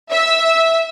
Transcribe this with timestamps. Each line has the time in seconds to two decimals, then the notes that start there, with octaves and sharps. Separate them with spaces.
0.12 E5